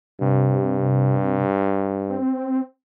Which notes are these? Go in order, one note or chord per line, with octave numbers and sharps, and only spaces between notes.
G2 C3
C4